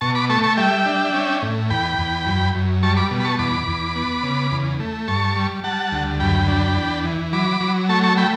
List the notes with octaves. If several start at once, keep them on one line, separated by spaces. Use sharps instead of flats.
B2 A5 C#6
B5 D6
A3 A5 C#6
A5 C#6
G3 E5 G5
D4
C#4
A2
E2 G5 B5
E2
F#2
F#2
G3 A5 C#6
B5 D6
B2
B5
A5 C#6
E2 B5 D6
E2
B3
C#3
E2
A3
G2 A5 C#6
G3
G3 F#5 A5
D2
F#2 G5 B5
D4
E2
E3
F#3 B5 D6
F#3
A3 A5 C#6
A5 C#6
A3 G5 B5